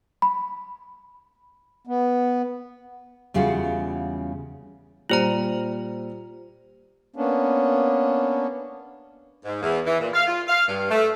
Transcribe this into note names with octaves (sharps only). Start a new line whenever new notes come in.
B5
B3
E2 C#3 G3 F4 F#4
A#2 G3 F4 C5 A#5
A#3 B3 C#4 D4
G#2
E2
E3
A#2
F5
F4
F5
G2
A3